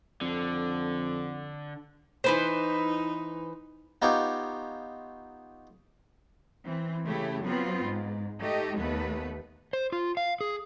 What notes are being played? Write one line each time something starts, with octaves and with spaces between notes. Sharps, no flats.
F2 D3
E3 D#4 B4 C5
B3 D#4 F4 G4 C#5
E3 C4
C#3 A3 E4 G4
F#3 B3 C4 F4
G#2
A3 D#4 G4 D#5
D#2 A3 B3 B4
C5
F4
F5
G#4